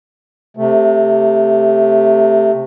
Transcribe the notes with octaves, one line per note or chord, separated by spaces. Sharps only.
C3 A3